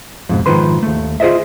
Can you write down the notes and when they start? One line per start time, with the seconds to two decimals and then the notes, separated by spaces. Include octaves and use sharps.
0.29 F2 G#2 B2
0.46 G#2 D#3 F3 B4 C6
0.83 D#2 A3
1.20 F4 G#4 A#4 C5 D#5 E5